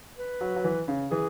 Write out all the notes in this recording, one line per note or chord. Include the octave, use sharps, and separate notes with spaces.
B4
F#3
F#3
E3
C#3
E3 G#4